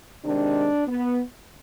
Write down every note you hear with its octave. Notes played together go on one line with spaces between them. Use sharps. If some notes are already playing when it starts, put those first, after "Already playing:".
C3 D#3 G#3 D4
B3